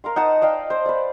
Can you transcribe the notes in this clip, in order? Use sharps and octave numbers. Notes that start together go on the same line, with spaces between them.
A#4 F5 C6
D#4 F#5 A5 D#6
D5 D#5 F5 G5
C5
B4 D5